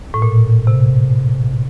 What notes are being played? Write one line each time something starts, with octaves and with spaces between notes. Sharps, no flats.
A2
A#2
C3